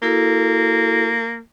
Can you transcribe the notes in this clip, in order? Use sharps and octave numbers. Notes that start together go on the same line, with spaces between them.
A#3 E4 F#4 A4